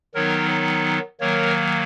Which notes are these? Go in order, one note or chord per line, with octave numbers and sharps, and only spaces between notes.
D#3 F#3 B3 D#4 A#4 C#5
D#3 F#3 A#3 A#4 C#5